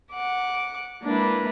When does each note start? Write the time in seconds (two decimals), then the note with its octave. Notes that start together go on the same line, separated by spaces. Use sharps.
0.12 F#5 D6
1.03 G#3 A#3 D4 E4 B4